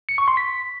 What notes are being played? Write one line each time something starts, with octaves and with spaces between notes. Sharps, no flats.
C#7
C#6
C6
B6